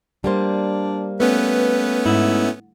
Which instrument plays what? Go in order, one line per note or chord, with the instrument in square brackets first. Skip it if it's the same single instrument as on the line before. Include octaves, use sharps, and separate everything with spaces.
[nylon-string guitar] G3 A#3 C5 [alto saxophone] D4
[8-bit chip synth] A3 B3 C#4 [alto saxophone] B4
[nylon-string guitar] G#2 [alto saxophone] E4